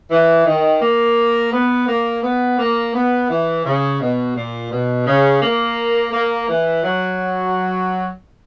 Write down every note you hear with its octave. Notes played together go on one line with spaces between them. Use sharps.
E3
D#3
A#3
B3
A#3
B3
A#3
B3
E3
C#3
B2
A#2
B2
C#3
A#3
A#3
E3
F#3